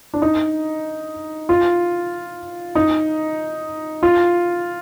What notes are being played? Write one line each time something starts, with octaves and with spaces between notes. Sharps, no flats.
D4
D#4
F4
D#4
F4